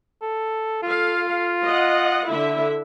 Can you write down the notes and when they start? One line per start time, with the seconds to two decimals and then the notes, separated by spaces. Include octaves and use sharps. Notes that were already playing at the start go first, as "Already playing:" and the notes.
0.22 A4
0.83 F4 A4 F5
1.66 D#5 F#5
2.28 D3 E4 E5